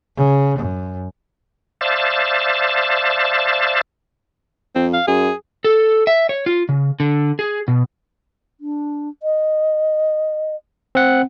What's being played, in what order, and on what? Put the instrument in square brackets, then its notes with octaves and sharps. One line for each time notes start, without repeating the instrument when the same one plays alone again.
[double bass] C#3
F#2
[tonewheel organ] C5 D5 E5 F5 A5
[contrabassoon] F2 [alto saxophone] C4
[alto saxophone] F5
[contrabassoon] F#2 [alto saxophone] G#4
[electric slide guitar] A4
E5
C#5
F4
C#3
D3
G#4
B2
[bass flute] D4
D#5
[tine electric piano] C4 F#5